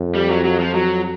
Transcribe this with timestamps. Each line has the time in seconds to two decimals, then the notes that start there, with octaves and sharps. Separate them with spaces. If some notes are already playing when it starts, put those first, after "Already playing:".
Already playing: F2
0.15 G3
0.29 F#3
0.45 F#3
0.59 F3
0.75 F#3